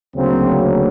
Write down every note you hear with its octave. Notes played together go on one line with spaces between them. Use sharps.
D2 C#3 F#3 A#3 C4